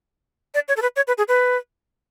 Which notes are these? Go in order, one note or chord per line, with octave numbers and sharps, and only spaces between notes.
D5
C#5
A4
B4
C#5
B4
G#4
B4